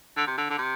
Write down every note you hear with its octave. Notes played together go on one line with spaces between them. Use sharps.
D3
C3
D3
D3
C3